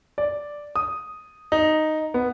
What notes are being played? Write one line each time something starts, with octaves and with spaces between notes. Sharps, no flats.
D5
D#6
D#4
B3